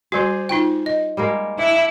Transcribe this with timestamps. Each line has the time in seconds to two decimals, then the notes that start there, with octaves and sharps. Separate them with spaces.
0.12 G3 F#4 G#4 C5 D5
0.49 D#4 F4 G5
0.86 D#5
1.17 G3 G#3 A#3
1.58 D4 E4 E5